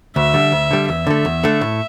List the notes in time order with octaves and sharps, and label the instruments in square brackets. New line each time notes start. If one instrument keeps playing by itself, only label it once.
[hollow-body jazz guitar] D2 [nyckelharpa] E5
[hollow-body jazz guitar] D3 G3
D2
D3 G3
[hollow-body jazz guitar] E2 [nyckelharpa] E5
[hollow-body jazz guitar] D3 A3
E2
D3 A3
A2